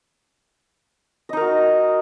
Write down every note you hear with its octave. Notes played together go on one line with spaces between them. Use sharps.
D#4 F#4 A#4 D#5